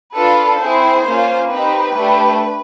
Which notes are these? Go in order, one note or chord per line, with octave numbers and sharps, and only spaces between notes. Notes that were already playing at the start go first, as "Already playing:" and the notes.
D4 F4 A4 B4
C4 E4 G#4 C5
A#3 C#4 F4
C4 D#4 G4 B4
A3 D4 G4